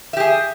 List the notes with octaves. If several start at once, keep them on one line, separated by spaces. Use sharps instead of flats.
G4 G#4 E5